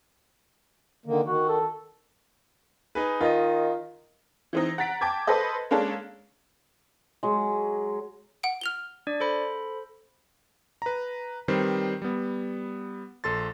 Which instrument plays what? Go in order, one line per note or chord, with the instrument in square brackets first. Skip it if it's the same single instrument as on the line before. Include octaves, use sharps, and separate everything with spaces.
[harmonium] D3 D#3 A#3
[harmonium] D#3 [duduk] F#4
[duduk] A4
[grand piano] D#4 G#4 B4
[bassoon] D#3 [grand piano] F4 D#5
[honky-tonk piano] E3 C4 D#4
F#5 A#5 A6 B6 D7
G5 A5 D6 G#6
A4 B4 C5 D#5
G#3 A#3 C#4 D4 A4
[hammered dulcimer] F#3 G#3
[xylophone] F#5 D7
F6 F7 G7
[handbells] D4 D5
A4 C5 B5
[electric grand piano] B4 A#5
D#3 G3 C4 B4 C5
G3 B3
A#1 A4 C6 A6